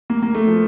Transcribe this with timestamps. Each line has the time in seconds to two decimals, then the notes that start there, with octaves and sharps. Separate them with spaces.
0.10 A#3
0.22 A#3
0.35 A3
0.48 F3